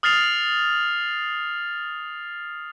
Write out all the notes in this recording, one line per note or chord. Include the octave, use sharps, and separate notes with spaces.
D#6 F6 A6 C7 F7